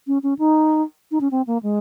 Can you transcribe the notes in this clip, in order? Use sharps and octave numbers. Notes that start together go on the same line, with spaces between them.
C#4
C#4
D#4
D#4
C#4
C4
A#3
G#3